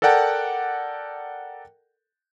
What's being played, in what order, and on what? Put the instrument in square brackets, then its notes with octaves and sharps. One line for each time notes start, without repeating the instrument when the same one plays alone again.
[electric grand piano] A4 A#4 D5 F#5 G5 A5